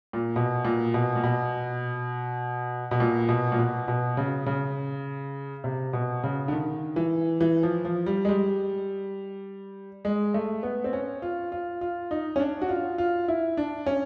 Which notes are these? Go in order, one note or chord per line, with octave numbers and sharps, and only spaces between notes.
A#2
B2
A#2
B2
A#2
B2
B2
A#2
B2
A#2
B2
B2
C#3
C#3
C3
B2
C#3
D3
D#3
E3
E3
F3
F3
G3
G#3
G3
G#3
A3
B3
C4
C#4
F4
F4
F4
D#4
C#4
D4
F#4
F4
F4
E4
D4
C#4